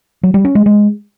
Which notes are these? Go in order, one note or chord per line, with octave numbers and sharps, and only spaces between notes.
F#3
G3
C#4
G#3
G#3